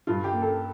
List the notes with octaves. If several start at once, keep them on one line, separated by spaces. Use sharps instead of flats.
G2 F4
G4
A#3
A4